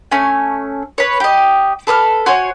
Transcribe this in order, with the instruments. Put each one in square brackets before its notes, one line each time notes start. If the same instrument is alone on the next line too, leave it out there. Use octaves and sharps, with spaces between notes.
[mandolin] A3 C#4 G#5
B4 C#5
G4 D#5
A4 B4 D#6 F6
F#4 C5 C#5 G#5